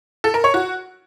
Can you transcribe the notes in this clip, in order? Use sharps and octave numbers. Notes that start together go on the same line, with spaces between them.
A4
A#4
C#5
F#4